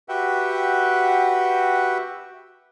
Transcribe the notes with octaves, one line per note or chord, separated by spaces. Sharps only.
F#4 G4 B4 E5 F#5 G5